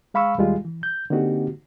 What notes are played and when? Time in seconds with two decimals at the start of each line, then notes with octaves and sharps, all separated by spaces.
0.14 G#3 F5 B5 C#6 E6
0.38 D#2 G3 G#3 F4
0.65 E3
0.83 G6
1.10 D3 A#3 C4 D#4 F#4 G4